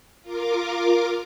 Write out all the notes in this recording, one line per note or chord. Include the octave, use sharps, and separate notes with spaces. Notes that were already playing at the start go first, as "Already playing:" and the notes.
F4 A#4 D6